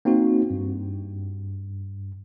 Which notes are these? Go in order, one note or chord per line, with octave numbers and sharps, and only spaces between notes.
A#3 C4 D#4 F#4
G2